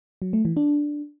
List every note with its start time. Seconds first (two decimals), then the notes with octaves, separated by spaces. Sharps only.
0.22 F#3
0.33 A3
0.45 E3
0.57 D4